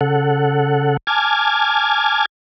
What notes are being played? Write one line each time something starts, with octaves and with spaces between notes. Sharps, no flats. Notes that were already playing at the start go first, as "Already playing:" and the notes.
C#3 A4 F#5
G#5 A5 D6 F6 G#6